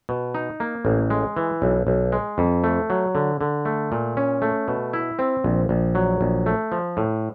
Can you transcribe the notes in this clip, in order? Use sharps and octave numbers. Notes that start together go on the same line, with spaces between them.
B2
D#4
A#3
A1
G#3
E3
B1
B1
G#3
F2
A3
F#3
D3
D3
A3
A#2
C#4
A3
B2
E4
C4
A#1
A#1
F#3
A#1
A3
F3
A2